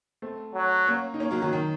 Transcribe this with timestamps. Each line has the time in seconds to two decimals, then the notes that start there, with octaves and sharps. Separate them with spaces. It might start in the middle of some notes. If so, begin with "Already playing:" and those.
0.22 A3 C4
0.54 F#3
0.87 A#3 C#4
1.14 D#4
1.20 A#3 C#4
1.31 F#3 A#3
1.42 D#3 F#3
1.53 D#3